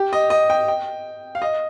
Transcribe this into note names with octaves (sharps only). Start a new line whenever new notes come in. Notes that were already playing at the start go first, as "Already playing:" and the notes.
Already playing: G4
D#5
D#5
G5
G5
F5
D#5